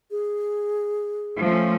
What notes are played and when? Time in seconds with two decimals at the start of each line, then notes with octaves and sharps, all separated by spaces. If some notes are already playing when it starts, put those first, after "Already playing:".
0.11 G#4
1.41 F3 A3 C#4